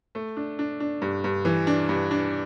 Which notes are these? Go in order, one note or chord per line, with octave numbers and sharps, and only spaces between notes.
A3
D4
D4
D4
G2
G2
E3
D4
G2
D4